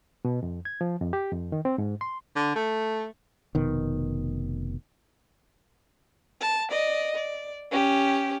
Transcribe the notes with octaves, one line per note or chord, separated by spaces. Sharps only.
B2
F2
G#6
F3
F2
G4
F2
D#3
C4
G#2
C6
D3
A3
F1 B2 D#3
A5
D5 D#5
D5
C#4 G4